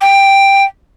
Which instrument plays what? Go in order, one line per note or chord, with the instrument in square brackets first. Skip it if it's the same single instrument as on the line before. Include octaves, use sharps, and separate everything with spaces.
[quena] G5